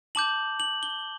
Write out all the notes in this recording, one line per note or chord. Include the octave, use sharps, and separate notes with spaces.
A5 D6 G6 F#7
F#7
G7